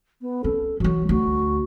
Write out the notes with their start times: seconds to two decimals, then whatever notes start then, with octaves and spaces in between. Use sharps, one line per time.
0.22 B3
0.44 C#4 A4
0.80 E3 F#3 F#4
1.09 D2 F#4